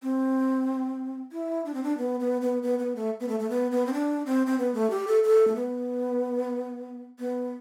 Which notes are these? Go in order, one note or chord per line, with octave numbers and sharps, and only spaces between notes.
C4
E4
D4
C4
D4
B3
B3
B3
B3
B3
A3
B3
A3
A3
B3
B3
C4
D4
C4
C4
B3
A3
G4
A4
A4
A3
B3
B3